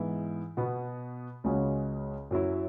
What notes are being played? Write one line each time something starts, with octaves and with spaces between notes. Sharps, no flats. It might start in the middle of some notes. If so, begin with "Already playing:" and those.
Already playing: G#2 E3 B3 E4
B2 B3 F#4
C#2 C#3 G#3 C#4 F#4
F#2 F#3 E4